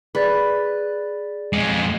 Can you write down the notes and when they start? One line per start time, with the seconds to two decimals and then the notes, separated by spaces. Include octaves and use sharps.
0.15 G#4 B4 D5 A6
1.53 F2 G#3